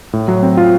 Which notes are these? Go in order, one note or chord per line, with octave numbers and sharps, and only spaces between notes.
A2
F#3
C4
F4